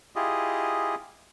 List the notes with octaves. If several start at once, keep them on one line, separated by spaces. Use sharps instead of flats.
E4 F4 G4 G#4 D#5